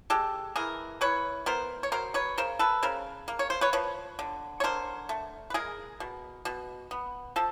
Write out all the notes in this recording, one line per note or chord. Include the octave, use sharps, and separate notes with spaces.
G#3 G4 A4
E3 G#4 A#4
E3 B4 C#5
B3 A#4 C5
C#5
F#3 A#4 C5
B4 C#5
C#3 A#4 C5
A4 B4
C#3 A#4 C5
A#3
C#5
C5
B4 C#5
F3 B4 C#5
D3
C#5
D3 A#4 C5
A3
B4
G#3 G#4 A#4
B2
B2
B3
F3 A4